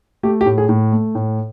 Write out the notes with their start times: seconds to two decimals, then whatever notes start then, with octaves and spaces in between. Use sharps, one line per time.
0.23 A3 G4
0.41 G4
0.46 A2
0.58 G#4
0.69 A2
0.92 A3
1.15 A2